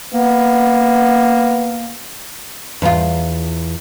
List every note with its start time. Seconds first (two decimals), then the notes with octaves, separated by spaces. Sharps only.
0.14 A#3 B3
2.82 E2 F4